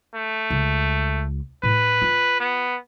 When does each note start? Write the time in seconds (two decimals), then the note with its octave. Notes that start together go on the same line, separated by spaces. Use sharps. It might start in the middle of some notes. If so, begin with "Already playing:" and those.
0.15 A3
0.50 C#2
1.63 A2 B4
2.02 F4
2.40 B3